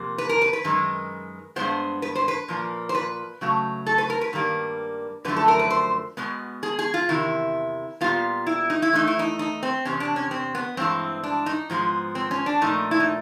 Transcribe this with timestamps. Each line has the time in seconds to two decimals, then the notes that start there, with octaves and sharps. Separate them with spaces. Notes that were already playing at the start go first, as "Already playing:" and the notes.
Already playing: F2 C3 A#3
0.18 B4
0.29 A#4
0.41 B4
0.53 B4
0.64 F#2 D#3 G#3
1.56 G2 D#3 G#3 B3 C5
2.02 B4
2.15 C5
2.28 B4
2.48 A#2 F3 A#3
2.89 C5
2.95 B4
3.41 C#3 F#3 A3
3.86 A4
3.98 B4
4.10 A#4
4.21 B4
4.33 G2 D#3 G3 A#3
5.25 F#2 D3 F3 A3 B4
5.36 A4
5.48 A#4
5.59 B4
5.70 C5
6.17 B2 G#3 B3
6.63 G#4
6.79 G#4
6.94 F4
7.09 E2 C3 D#3 E4
8.01 A#2 G3 B3 F4
8.47 E4
8.70 D#4
8.82 E4
8.93 E2 C#3 E3 A3 D#4
9.07 E4
9.19 D#4
9.39 D#4
9.63 C4
9.85 E2 C3 C#4
10.00 D4
10.16 C#4
10.31 C4
10.55 B3
10.77 G2 E3 G#3 C4
11.23 D4
11.46 D#4
11.70 G#2 F3 G#3 B3
12.15 C4
12.31 C#4
12.46 D4
12.61 A#2 F3 A3 D#4
12.91 E4
13.00 D#4